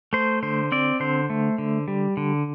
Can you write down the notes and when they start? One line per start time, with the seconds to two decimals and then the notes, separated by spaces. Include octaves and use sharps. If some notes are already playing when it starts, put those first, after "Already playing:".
0.13 A3 C5
0.43 D3 C5
0.72 C4 D5
1.00 D3 C5
1.30 A3
1.58 D3
1.88 G3
2.17 D3